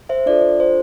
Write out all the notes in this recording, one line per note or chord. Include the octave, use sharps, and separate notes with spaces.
C5 E5
D4 F4 A4 D5
C5